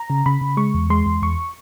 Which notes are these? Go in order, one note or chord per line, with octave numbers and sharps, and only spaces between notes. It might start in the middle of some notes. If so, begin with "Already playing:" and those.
Already playing: A#5
C#3
C#3 B5
C#3
G#3 C#6
E2
G#3 C6
E2
E2 C#6